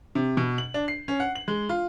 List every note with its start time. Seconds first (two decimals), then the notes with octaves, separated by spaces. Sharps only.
0.15 C3
0.37 B2
0.58 F#7
0.74 D4
0.88 C7
1.08 C#4
1.20 F#5
1.35 F#7
1.48 G#3
1.69 F4